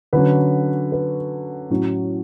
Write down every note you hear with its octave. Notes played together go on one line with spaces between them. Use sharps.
D3 F#3 C#4 B4
B4
A2 F#3 C#4